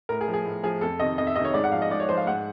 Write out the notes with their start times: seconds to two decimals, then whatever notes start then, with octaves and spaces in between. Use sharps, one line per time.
0.09 A2 A#4
0.21 G#4
0.28 F3
0.34 G#4
0.45 A2
0.63 F3 G#4
0.81 F2 A4
1.00 C3 D#3 D#5
1.18 F2 D#5
1.27 E5
1.36 C3 D#3 D#5
1.45 C#5
1.54 G#2 D5
1.64 F#5
1.72 F3 F5
1.82 D#5
1.91 G#2 D5
2.00 C#5
2.09 F3 C5
2.17 F5
2.27 G#2 F#5